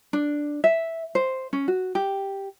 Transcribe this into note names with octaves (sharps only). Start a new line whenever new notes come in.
D4
E5
C5
C#4
F#4
G4